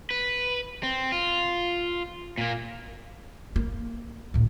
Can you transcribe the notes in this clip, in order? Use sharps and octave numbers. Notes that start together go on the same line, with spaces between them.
B4
C4
F4
A#2 A#3
A#3
D2 A2